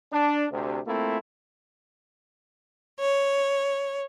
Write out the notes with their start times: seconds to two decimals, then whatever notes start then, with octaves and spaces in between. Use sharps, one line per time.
0.12 D4
0.52 D2 C3
0.86 A3 A#3 C4 E4 F4
2.99 C#5